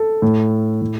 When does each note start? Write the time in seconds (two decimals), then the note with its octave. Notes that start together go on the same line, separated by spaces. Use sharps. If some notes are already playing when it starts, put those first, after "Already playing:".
Already playing: A4
0.22 A2
0.82 A2